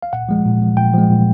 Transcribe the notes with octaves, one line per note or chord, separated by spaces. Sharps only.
F5
A#2 F#5
F3 G#3
A#2
F3 G#3
A#2 G5
F3 G#3
A#2